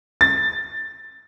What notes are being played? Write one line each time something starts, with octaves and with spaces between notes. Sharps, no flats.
A6